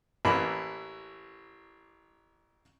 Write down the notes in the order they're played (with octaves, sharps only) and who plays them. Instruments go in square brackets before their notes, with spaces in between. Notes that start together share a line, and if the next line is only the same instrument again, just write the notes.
[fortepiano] A1 E3 A#3 B5